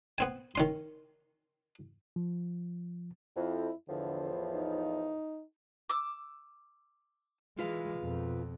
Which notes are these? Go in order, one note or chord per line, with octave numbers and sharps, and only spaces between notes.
B3 C4 G#5
D#3 C#4 C6
F3
F2 E4
E2 A2 D3 F3
D#4
D6 E6
E3 G#3 F4 B4 F5
F2 B2